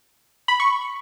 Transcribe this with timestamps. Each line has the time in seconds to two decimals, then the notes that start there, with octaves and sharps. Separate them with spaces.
0.48 B5
0.60 C#6